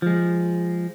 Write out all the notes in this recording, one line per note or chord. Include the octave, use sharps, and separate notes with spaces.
F3 G#3